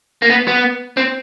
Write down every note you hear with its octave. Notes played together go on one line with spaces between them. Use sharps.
A#3
B3
B3
C4